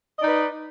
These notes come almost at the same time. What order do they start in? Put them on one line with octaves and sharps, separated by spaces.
D#5 D5 D#4 B4